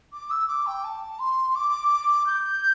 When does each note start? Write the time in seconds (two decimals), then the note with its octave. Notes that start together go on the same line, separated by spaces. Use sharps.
0.13 D6
0.30 E6
0.48 D6
0.66 G5
0.84 A5
1.19 C6
1.55 D6
2.27 G6